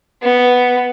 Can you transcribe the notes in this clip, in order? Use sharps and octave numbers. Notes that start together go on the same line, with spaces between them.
B3